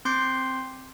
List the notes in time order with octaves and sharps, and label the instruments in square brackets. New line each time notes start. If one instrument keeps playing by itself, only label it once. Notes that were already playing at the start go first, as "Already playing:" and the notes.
[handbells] C4 C6 D6 G6 C7